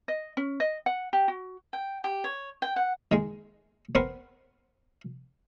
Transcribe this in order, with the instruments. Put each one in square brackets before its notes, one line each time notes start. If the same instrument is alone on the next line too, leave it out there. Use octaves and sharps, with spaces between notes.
[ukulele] D#5
C#4
D#5
F#5
G4
F#4
[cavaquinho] G5
G4
C#5
G5
F#5
[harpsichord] D#3 G#3
B3 C4 A#4 B4